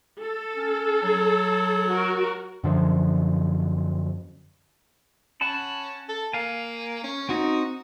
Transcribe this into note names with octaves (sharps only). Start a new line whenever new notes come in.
A4
C#4
F#3
F#4 A#4
F#2 D3 F3
C#4 F#5 A5 B5
A4
A#3 F5 G#5
C#4
C4 D#4 F#4